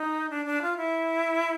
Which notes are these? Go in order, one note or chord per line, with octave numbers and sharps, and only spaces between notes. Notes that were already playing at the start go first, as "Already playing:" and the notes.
Already playing: D#4
D4
D4
F4
E4